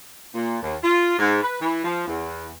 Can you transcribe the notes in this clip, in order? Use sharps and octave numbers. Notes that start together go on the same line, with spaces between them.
A#2
D#2
F4
G#2
B4
E3
F3
E2